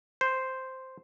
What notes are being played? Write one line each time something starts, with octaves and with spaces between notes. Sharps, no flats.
C5